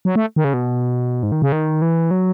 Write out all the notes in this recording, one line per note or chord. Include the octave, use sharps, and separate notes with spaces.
F#3
A3
D#3
C#3
B2
G#2
D#3
C#3
D#3
E3
F#3